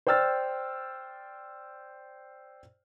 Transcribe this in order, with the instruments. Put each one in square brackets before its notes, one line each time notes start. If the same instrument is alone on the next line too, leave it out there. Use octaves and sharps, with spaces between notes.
[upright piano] C5 D5 G5 E6 F6 A6